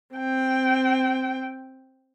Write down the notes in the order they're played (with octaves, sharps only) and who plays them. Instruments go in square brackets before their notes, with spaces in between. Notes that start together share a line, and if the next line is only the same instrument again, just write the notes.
[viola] C4 G5